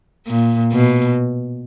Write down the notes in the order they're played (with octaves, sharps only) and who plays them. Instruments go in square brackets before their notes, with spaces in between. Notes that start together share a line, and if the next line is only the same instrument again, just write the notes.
[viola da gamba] A#2
B2